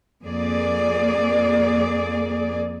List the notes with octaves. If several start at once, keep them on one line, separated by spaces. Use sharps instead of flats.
F2 A#3 G#4 D5